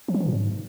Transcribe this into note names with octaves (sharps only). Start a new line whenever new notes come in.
F3
F#3
E3
A#2
G#2